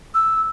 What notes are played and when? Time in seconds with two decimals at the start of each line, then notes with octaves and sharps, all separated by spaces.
0.14 E6